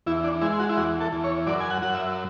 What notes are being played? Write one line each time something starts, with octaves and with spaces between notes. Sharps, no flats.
E2 E4
D4
G#3 E4
F#4
E4
E2 F#4
A4
E2
C#5
F#2 D5
G#5
F#5
F#2 F#5
E5